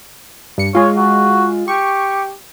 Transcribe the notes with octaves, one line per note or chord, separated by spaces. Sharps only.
G2 C#7
G#3 F4 C#5
F#4
G4 C#6